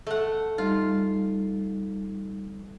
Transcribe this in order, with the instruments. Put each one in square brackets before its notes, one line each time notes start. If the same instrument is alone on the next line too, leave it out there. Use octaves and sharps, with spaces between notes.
[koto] A3 F#5
[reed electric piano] G3 D#4 [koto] F4